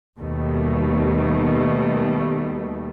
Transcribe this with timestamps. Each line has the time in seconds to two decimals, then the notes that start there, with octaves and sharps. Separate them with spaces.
0.18 D#2 B2 D#3 G3 A3